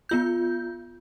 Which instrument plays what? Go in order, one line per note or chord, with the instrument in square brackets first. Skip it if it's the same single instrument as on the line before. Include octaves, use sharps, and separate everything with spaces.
[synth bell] B3 F4 G6